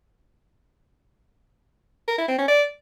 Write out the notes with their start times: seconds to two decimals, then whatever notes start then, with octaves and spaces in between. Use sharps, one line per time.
2.08 A#4
2.18 E4
2.28 C4
2.38 C#4
2.48 D5